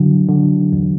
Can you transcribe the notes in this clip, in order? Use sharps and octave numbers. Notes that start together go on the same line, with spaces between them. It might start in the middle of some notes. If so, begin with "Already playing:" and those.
Already playing: D3 F#3
D3
E2